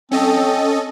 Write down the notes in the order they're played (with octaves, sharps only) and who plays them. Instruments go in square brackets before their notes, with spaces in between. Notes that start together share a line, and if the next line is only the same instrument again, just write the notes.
[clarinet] C4 [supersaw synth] C#4 A4 D#5